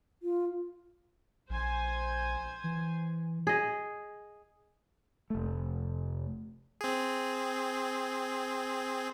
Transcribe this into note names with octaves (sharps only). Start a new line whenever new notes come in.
F4
A#1 C5 G#5
E3
G#4 D#5
F1 A3
C4 G#4